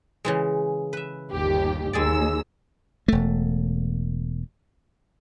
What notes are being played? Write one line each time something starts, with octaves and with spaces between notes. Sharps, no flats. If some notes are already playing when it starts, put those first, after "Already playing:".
C#3 E3 G#3
B4 E5
G1 D#2 G4
D#2 G#3 G#4 D5 E6
E1 A3